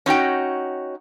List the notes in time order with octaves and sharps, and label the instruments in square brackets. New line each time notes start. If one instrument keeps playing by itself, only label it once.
[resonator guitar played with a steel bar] C#4 D#4 F#4 G5